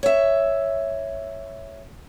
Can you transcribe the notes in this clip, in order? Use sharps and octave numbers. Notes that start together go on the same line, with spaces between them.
C#5 E5